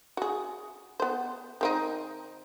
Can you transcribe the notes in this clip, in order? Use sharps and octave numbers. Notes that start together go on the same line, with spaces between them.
F#4 G#4
B3 C5
D#3 C4 D#4